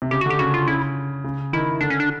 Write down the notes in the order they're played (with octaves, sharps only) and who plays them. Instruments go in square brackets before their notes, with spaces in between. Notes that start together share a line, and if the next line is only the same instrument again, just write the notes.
[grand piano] C3
[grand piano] C#3 [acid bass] G4
[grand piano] D3 [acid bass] F#4
[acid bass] G4
[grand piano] C#3 [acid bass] F#4
[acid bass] F4
[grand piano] C#3 [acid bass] E4
[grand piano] C#3
[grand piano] D#3 [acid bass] E4
[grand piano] D3 [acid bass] D4
[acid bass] C#4
D4